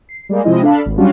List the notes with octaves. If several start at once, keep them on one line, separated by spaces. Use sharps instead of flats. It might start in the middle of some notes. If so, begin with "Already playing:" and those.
C7
G3 G#3 A#3
C3 F3 G#3 E4 D#5
D4 A4 F5 B5
G#1
F#3 G3 C#4 D4 F4 F#4